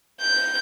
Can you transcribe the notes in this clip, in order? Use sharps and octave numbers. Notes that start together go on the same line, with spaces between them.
G6